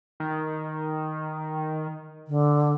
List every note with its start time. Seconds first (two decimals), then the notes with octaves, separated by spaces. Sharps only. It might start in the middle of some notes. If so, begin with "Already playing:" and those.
0.20 D#3
2.28 D3